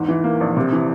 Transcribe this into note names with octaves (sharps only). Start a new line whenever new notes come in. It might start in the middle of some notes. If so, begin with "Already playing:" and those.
Already playing: E2 G#2
E3
A#3
A#1
C3
E3